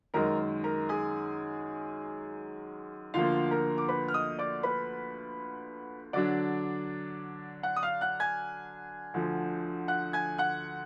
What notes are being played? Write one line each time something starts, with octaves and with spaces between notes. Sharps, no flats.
F#2 D#3 G#3 A#4 A#5
A#4 A#5
G#4 G#5
D2 D3 F3 A#3 F4 F5
A#4 A#5
D6
B4 B5
F6
D#5 D#6
D5 D6
B4 B5
D3 F#3 D4 D5 D6
F#5 F#6
D#6
F5 F6
F#5 F#6
G#5 G#6
D2 D3 F3
F#5 F#6
G#5 G#6
F#5 F#6